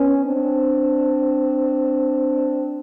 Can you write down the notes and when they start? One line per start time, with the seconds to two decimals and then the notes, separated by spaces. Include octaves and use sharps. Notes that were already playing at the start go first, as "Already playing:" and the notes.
Already playing: B3 C#4
0.24 C4 D4